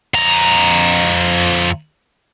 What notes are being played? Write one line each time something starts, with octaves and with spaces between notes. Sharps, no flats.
F2 A#5